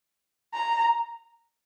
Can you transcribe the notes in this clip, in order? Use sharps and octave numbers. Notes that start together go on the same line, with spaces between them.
A#5